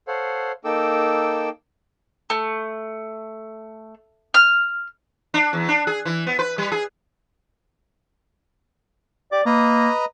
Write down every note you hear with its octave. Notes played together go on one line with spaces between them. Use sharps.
A4 C5 C#5 F5 F#5
A#3 D#4 A4 G5 D6 E6
A3
F6
D4
E2
D4
G#4
E3
B3
B4
G3
G#4
G4 D5 D6
A#3 B4 D#5 A#5